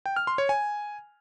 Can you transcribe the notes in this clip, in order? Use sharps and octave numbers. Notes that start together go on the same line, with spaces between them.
G5
F6
C6
C#5
G#5